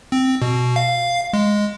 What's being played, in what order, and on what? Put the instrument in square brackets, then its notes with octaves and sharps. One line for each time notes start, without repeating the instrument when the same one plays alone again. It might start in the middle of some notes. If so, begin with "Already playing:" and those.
[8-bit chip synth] C4
B2
F5
G#3